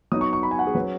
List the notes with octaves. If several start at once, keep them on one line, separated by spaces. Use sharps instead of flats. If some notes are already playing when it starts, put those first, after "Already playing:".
F#3 B3 D#4 D#6
C#6
C#6
B5
G#5
F#5
G#4
F#3 C#4 B4